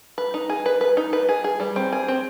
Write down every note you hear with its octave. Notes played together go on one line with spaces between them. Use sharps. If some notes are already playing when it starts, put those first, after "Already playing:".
B4
D#4
G#4
B4
B4
D#4
B4
G#4
G#4
G3
C4
G#4
C4